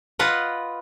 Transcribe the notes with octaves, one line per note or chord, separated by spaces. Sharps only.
F4 B4 D#5 F#5